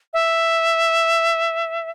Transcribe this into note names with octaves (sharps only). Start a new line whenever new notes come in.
E5